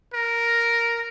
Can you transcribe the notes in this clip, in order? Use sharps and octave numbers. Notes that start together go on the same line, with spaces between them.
A#4